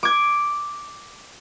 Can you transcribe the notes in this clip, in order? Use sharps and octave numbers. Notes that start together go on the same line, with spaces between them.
D6 G#6